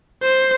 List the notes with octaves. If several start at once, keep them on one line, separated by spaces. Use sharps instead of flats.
C5